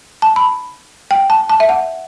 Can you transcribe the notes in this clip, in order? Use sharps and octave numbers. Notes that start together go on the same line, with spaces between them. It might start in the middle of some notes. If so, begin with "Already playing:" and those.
A5
B5
G5
A5
A5
E5
F#5